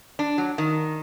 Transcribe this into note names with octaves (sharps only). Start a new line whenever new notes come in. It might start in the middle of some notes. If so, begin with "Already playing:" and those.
D4
F#3
D#3